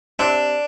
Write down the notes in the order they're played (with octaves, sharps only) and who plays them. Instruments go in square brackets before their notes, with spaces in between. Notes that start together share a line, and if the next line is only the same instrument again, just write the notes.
[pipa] C3 [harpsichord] D4